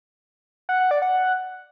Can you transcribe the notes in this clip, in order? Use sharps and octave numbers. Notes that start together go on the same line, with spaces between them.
F#5
F#5
D5
F#5